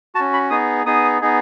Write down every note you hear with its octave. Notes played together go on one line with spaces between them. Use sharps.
F#4 A5
C#4
B5
B3 D#4 G#4 D#6
B3 D#4 G#4 D#6
B3 D#4 G#4